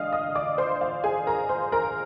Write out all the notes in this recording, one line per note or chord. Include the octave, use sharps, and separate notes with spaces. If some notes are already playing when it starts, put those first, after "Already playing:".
Already playing: D3 G#3 D5 D#5 F5 D#6 F6
D#5 D#6
D5 D6
C5 C6
F5
G#4 G#5
A#4 A#5
C5 C6
A#4 A#5